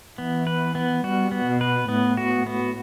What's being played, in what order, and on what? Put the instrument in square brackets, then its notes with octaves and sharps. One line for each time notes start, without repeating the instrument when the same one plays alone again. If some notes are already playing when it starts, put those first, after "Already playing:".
[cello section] E3 [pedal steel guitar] B3
[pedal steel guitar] B4
B3
[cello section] G3 [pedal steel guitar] F#4
[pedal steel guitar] B3
[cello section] B2
[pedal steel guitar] B4
[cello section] A2 [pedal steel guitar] B3
[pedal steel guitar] F#4
B3